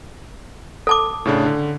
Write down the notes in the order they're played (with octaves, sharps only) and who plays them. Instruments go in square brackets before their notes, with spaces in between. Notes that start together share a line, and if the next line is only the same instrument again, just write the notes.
[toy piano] A4 A5 D6
[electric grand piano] A2 C#3 D4
D3